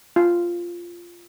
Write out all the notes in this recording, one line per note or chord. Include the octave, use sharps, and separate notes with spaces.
F4